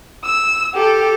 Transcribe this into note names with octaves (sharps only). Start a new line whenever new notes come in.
E6
G4 A4